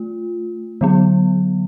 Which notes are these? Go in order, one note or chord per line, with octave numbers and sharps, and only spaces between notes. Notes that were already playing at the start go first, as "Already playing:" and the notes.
Already playing: A3 F4
D3 F#3 B3